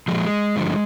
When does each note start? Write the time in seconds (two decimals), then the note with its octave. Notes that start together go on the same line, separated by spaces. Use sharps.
0.08 A#2 F3 G#3
0.56 G2 D3 F3